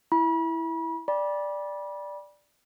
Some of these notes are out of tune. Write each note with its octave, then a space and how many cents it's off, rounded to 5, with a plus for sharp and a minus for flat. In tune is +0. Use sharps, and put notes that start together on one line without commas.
E4 +0 B5 -35
D5 +0 G5 +35 B5 -30